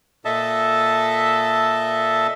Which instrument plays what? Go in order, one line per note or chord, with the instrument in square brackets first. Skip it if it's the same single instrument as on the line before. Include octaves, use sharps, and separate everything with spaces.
[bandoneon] A#2 A4 D#5 E5 A5